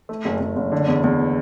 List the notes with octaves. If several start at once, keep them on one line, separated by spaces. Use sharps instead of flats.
A3
F#1
F#1
F#1
D3
E2
E2